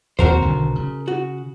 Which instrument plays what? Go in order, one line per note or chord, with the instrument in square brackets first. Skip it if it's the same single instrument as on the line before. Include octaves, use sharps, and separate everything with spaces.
[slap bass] D#2 B3 C4 [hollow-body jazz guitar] F#4 A#4 C5
[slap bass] B1 D3 D#3
C#3
[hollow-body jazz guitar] F#4